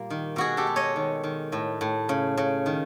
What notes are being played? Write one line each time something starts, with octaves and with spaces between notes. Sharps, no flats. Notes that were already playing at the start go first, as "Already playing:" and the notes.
Already playing: A#2 G3 A#3
D#3
B2 F#4 G#4
G4 A4
G#3
C#5 D#5
D#3
D#3
A2
A2
C#3
C#3
D#3